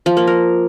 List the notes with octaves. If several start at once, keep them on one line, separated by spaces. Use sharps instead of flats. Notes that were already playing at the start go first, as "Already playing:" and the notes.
F3
A#3
A#4